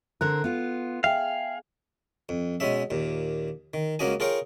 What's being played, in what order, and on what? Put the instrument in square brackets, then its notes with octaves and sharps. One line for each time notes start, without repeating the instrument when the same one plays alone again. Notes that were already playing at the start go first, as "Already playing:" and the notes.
[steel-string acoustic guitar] D3 C4 A#4 [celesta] F#6
[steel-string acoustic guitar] B3 F4
[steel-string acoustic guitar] G#4 [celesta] E5 G5 [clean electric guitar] F5
[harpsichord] F2
B2 G#3 C#4 E5
D#2 A#2
D#3
C#2 A#3 C#4 F#4 D#5 G#5
F4 G#4 A#4 C#5 G5